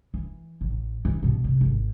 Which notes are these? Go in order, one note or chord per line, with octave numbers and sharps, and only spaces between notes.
E3
A1
E3
B2 B3
C3
G#1